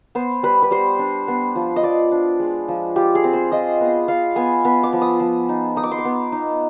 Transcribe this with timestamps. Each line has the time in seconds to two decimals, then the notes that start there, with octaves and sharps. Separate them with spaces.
0.15 B3 C5
0.43 G3 B4
0.62 B4
0.71 G3 C5
0.99 D4
1.28 B3
1.55 F3
1.76 D#5
1.83 F3 D5
2.12 D4
2.40 G#3
2.68 F3
2.96 F4 G4
3.15 G#4
3.24 C4
3.33 C5
3.52 F4 D#5
3.81 B3
4.08 F4 F5
4.36 B3 G#5
4.65 B3 B5
4.83 D6
4.93 F3
5.02 D#6
5.20 F3
5.49 D#4
5.76 D#4 D#6
5.83 D6
5.91 C6
5.99 D6
6.05 B3
6.32 D#4